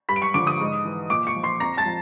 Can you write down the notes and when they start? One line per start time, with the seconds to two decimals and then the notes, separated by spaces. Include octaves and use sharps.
0.09 G2 B5 B6
0.16 D7
0.22 C#6 C#7
0.34 D3 F3 D6 D7
0.47 D#6 D#7
0.60 G#2
0.85 E3
1.10 A#2 D6 D7
1.27 C#6 C#7
1.36 F3
1.43 C6 C7
1.60 F2 A#5 A#6
1.77 A5 A6
1.86 F3